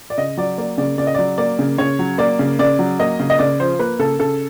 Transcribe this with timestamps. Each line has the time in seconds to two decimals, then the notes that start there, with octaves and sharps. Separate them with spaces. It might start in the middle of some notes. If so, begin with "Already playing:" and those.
0.10 D5
0.18 C#3 D#5
0.37 F#3 D5
0.58 A#3 D5
0.78 C#3 D5
0.98 C#3 D5
1.07 D#5
1.14 F#3 D5
1.38 A#3 D5
1.59 C#3
1.78 C#3 C#5
1.99 F#3
2.18 A#3 D5
2.39 C#3
2.59 C#3 D5
2.79 F#3
2.99 A#3 D#5
3.19 C#3
3.30 D#5
3.39 C#3 D5
3.60 F3 C5
3.79 A#3 B4
3.99 C#3 A4
4.19 C#3 A4